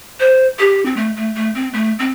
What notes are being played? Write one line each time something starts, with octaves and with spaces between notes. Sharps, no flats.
C5
G4
C4
A3
A3
A3
C4
A3
C4